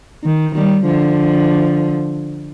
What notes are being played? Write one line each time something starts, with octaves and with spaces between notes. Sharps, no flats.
D#3
D#3 G3
D3 F3